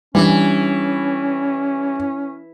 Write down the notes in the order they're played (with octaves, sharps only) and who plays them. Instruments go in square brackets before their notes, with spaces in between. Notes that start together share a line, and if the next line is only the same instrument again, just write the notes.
[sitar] E3 [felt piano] G3 D4 [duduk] C#4